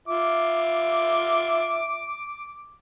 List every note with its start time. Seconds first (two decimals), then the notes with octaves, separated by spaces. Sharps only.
0.08 F4 E5 D6